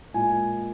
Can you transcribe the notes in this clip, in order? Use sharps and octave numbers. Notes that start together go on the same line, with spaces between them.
A#2 G#3 G#5